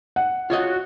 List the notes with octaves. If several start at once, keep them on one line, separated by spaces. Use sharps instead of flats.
F#5
F4 F#4 C#5 D#5